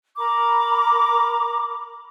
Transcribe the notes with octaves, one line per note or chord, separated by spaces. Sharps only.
A#4 A#5 B5 D6